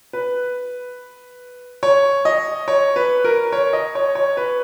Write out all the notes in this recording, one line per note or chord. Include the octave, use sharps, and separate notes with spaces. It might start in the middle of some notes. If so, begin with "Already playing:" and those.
B4
C#5
D#5
C#5
B4
A#4
C#5
D#5
C#5
C#5
B4